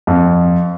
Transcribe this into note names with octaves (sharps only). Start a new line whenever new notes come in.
F2